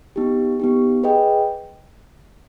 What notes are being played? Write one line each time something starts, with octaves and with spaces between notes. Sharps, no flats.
B3 D#4 G4
B3 D#4 G4
G#4 B4 D#5 G5